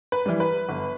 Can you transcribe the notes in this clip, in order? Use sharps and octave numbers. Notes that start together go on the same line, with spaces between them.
B4
E3 G3
B4
G1